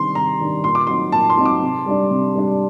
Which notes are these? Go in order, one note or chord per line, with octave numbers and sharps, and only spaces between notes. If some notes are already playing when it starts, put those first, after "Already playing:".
Already playing: C3 D#3 G3 D4 C6
C3 A#5
D#3 G3 D4
A#2 C6
D6
F#3 C4 D#4 C6
A#2 A5
C6
F#3 C4 D#4
D6
C3
G3 D4
C3
G3 D4